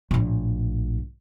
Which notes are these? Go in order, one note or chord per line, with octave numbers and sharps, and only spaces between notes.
A#1 A2